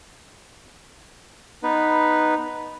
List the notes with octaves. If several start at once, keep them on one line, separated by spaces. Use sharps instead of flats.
B3 D#4 B4